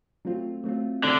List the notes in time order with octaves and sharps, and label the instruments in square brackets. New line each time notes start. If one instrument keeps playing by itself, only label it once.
[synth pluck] F#3 A3 C4 F4
F#3 A3 C4 F4
[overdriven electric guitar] D3 [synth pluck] F#3 A3 C4